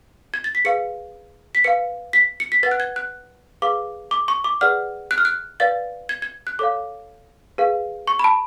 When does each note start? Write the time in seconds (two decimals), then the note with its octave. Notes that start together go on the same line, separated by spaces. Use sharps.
0.34 G#6
0.44 A6
0.55 B6
0.65 G#4 B4 F5 C#7
1.55 B6
1.64 B4 F5 C#7
2.13 B6
2.40 C#7
2.52 B6
2.63 B4 F#5 A6
2.71 F#6
2.80 G#6
2.96 F#6
3.62 G#4 B4 F5 D6
4.11 D6
4.28 C#6
4.44 D6
4.61 G#4 B4 D5 F#5 F6
5.11 F#6
5.18 F6
5.25 F#6
5.60 B4 D5 F5 A6
6.09 G#6
6.22 G#6
6.47 F#6
6.59 A4 C#5 F5 D6
7.58 G#4 B4 F5
8.07 C#6
8.19 B5
8.24 A5